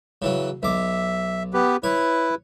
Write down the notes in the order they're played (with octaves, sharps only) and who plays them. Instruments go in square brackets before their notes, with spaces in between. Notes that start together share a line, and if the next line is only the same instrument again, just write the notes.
[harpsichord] C#3 E3 F#3
[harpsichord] B1 D6 [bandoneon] E5
[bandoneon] B3 G4 B4
[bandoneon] E4 B4 [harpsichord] C#5